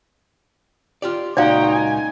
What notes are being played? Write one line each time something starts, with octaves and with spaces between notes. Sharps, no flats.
F4 G4 D5
C#2 A#2 D#4 F#4 D5 F5 G5
G#5